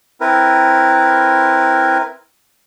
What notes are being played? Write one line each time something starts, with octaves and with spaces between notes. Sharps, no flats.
C4 E4 A#4 B4